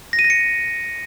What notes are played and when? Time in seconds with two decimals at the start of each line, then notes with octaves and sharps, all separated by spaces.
0.13 A#6
0.19 D#7
0.24 A#6
0.30 C#7